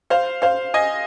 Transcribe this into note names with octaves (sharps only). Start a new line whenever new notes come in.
C5 F5
C5 F5
D#5 G#5